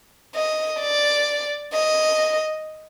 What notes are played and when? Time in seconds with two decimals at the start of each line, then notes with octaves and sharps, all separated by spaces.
0.35 D#5
0.81 D5
1.73 D#5